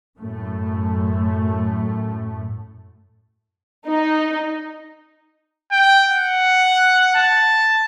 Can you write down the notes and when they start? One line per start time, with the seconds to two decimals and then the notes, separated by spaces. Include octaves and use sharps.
0.19 F#2 A2 A3
3.86 D#4
5.72 G5
6.10 F#5
7.15 A5